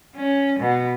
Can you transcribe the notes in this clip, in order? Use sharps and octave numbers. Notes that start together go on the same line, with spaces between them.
C#4
B2